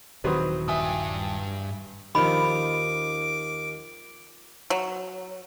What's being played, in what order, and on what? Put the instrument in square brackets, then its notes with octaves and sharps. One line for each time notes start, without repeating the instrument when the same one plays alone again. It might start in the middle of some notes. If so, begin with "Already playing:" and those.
[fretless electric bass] D#1 D#3 E3 [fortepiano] C3 F#3 [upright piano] B4 C5 D#6
[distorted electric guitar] G2 G5 [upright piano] E5 G#5 D#6
[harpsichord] D#2 [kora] D#3 F3 [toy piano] B5 [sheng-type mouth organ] D6
[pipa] F#3